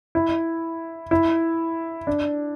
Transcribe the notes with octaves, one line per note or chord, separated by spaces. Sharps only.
E4
E4
D4